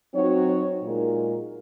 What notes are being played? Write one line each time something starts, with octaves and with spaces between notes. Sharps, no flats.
F#3 C4 D#4 F#4 C#5
A#2 G#3 D#4 A#4